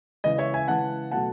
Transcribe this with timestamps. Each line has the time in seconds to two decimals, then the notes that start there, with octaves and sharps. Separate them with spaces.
0.24 C#3 E3 G#3 D#5
0.38 C#5 E5
0.54 E5 G#5
0.68 C#3 E3 G#3 F#5 A5
1.11 B2 F#3 A3 F#5 A5